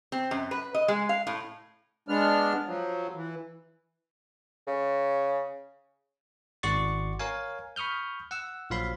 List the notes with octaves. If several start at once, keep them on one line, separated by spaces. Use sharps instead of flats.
C4
F#2
B4
D#5
G#3
F5
A2
G#3 B3 D4 F6
F3 F#3
E3
C#3
G#1 F#4 D5 C6 C#6 A6
A#4 C#5 F5 G#5
B5 C#6 D#6 F6 G6
F#5 E6
A#1 F3 F#3 F5 B5 C6